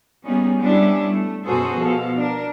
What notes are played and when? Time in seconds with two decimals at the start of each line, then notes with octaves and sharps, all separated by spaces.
0.24 G3 A#3 B3 C#4 D#4 G#4
0.60 G3 G#3 B3 C#4 D4 E4
1.08 A3
1.43 F#2 B2 F#4 G#4 A4 C5
1.76 B2 F3 A4 F5
2.16 D4 A#4